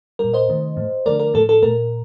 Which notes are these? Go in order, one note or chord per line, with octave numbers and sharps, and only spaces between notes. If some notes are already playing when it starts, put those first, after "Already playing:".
A#2 G3 A#4
C5 D#5
C3 D#3 A3
A2 F3 A3
D3 F3 A3 A#4 D5
A#4
A2 F3 A3 A4
A4
A#2 A3 A#4